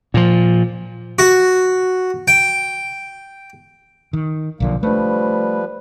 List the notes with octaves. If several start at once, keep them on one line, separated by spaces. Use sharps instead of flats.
A#2 F3
F#4
G5
D#3
B1 A#2 D3 F3 A#3
F3 G3 A3 D4 B4